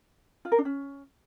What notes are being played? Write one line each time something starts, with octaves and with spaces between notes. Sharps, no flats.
F4
A#4
D4
C#4